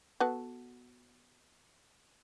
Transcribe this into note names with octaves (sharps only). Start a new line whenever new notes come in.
B3 F#4 A4